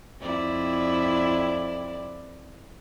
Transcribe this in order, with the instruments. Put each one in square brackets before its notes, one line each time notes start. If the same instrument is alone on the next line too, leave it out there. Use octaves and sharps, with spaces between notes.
[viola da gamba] F2 E4 D5